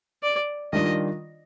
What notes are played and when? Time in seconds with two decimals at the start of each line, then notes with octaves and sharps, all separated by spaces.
0.23 D5
0.73 D#3 G3 D4 F4 D#5